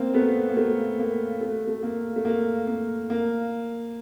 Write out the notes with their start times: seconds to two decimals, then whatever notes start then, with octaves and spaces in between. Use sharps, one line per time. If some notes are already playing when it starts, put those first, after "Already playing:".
Already playing: A#3 C4
0.14 A3 B3
0.49 A#3
0.57 A3
0.99 A#3
1.41 A3
1.67 A3
1.83 A#3
2.16 A3
2.25 A#3
2.67 A#3
3.10 A#3